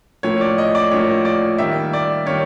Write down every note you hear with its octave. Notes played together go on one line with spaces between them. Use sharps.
A2 F3 A#3 C#5
D5
D#5
D5
A2 F3 A#3 C#5
D5
D#3 G3 A#3 E5
D5
D#3 G3 A#3 C#5